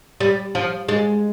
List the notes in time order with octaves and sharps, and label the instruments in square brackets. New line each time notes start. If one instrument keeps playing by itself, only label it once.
[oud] G3
F3
G#3